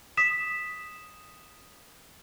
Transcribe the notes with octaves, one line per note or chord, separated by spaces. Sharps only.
D#6 B6 E7